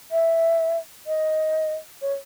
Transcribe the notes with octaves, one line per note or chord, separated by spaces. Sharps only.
E5
D#5
C#5